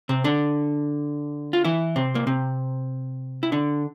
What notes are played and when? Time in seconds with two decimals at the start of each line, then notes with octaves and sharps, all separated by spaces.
0.09 C3 C4
0.24 D3 D4
1.53 F4
1.65 E3 E4
1.96 C3 C4
2.15 A#3
2.27 C3 C4
3.43 E4
3.52 D3 D4